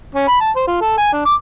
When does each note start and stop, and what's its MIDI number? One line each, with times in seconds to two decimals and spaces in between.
0.15 0.28 61
0.28 0.36 83
0.41 0.51 81
0.56 0.65 72
0.67 0.81 65
0.81 0.95 69
0.98 1.09 80
1.13 1.22 62
1.25 1.34 86